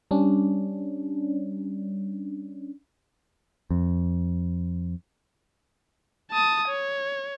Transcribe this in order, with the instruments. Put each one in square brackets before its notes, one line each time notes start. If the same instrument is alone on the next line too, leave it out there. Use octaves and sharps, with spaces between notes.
[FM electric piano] G3 C#4 D4
[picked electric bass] F2
[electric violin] A5 D#6
C#5